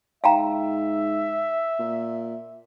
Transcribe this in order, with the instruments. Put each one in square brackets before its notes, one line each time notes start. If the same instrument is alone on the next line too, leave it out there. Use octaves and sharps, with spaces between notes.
[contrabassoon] G#2 [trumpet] E5 [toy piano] F5 G5 A#5
[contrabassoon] A#2